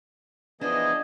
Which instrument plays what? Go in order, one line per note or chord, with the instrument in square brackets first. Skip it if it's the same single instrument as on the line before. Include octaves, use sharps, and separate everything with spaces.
[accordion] E3 F3 B3 [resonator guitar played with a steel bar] D4 D5 [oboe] G#4 [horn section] D#5